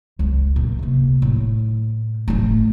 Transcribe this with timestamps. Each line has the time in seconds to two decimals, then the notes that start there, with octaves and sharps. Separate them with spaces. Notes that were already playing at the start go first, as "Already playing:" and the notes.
0.19 C#2
0.56 A#2
0.79 C3 A#3
1.22 A2
2.28 A1 A2